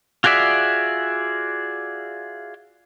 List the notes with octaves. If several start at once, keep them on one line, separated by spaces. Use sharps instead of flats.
F4 F#4 G#4 D5 E5